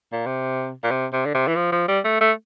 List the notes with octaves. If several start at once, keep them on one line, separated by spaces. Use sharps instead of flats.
A#2
C3
A#2
C3
C3
D3
C3
E3
F3
F3
G3
A3
A3